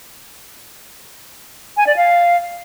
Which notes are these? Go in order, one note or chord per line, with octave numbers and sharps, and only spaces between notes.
G#5
D5
F5